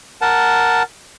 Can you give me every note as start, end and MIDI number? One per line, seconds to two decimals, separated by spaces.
0.22 0.83 70
0.22 0.83 78
0.22 0.83 81